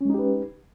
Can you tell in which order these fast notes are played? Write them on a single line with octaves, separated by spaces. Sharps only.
C#4 G#3 D#4 G4 B4